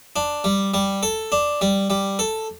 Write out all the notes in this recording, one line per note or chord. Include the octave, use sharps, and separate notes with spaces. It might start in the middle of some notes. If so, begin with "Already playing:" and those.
D4
G3
G3
A4
D4
G3
G3
A4